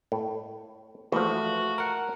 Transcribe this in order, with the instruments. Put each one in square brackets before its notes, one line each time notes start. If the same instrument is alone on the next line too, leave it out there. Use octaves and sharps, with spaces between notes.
[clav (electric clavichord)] A2
[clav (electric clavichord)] E3 F3 [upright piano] A3 [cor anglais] F#4
[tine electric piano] A#4 F#5